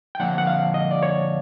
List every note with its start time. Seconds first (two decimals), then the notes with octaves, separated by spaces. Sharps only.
0.15 G5
0.20 D3 F3 A#3 D4 F#5
0.38 F#5
0.47 F5
0.74 D#5
0.91 D5
1.03 C#5